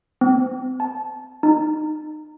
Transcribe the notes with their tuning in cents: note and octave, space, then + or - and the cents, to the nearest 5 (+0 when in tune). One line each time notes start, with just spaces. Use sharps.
C4 -30
A5 -20
D#4 -25